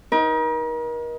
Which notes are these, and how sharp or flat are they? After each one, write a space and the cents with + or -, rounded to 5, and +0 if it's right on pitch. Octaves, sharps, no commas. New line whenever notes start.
D#4 +20 A#4 +40